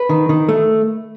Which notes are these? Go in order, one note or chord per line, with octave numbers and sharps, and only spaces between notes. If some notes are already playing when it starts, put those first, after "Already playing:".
Already playing: B4
D#3
D#3
A3